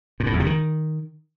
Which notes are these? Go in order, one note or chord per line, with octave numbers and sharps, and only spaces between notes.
A#2
A2
E2
C3
D#3